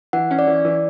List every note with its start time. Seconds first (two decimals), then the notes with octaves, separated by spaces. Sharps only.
0.13 E3 F#5
0.31 C#4
0.39 D5
0.47 E3
0.65 E3